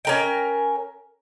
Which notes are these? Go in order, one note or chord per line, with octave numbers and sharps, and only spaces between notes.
C#4 A#4 G5